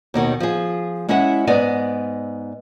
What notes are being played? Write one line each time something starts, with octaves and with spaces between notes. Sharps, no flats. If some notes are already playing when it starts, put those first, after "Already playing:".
D#2 B2 D#3 C#5
F3 G#4
G#3 C#4 E4 E5 F#5
G#2 B3 D5 D#5 G#5